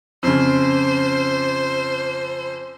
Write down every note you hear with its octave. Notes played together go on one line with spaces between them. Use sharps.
F2 C#3 C5